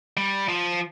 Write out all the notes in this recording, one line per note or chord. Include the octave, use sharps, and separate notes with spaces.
G3
F3